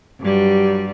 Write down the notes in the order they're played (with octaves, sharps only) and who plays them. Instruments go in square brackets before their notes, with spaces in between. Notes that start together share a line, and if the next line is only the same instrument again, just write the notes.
[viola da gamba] G2 F#3 G3